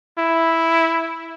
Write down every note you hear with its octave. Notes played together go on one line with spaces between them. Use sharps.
E4